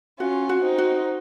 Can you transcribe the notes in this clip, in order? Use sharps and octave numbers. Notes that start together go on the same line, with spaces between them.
C#4 F4 F#4
F#4
C4 D#4
F#4